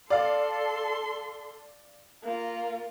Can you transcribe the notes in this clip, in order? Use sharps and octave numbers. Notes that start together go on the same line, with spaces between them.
A4 D5 F5 C6
A#3 F4